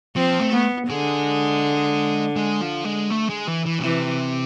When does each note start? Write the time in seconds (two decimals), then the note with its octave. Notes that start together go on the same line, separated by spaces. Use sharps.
0.16 F3 C4
0.40 A3
0.52 B3
0.89 D3 G#3
2.36 G#3
2.62 F3
2.85 G#3
3.10 A3
3.29 G#3
3.47 E3
3.65 E3
3.79 B2
3.83 C3 E3